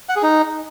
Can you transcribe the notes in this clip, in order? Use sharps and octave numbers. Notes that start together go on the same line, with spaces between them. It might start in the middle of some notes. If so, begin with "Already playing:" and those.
F#5
G#4
D#4